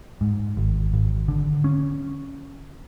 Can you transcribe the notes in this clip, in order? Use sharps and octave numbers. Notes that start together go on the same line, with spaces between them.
G#2
G#1
G#1
D3
C#4